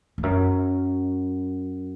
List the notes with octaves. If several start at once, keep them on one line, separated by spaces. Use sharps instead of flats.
F2
F#2